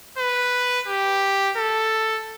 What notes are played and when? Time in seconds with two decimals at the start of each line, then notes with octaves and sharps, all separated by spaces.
0.18 B4
0.88 G4
1.57 A4